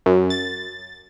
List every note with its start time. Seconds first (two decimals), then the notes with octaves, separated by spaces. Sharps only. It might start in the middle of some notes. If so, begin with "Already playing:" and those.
0.06 F#2
0.30 A6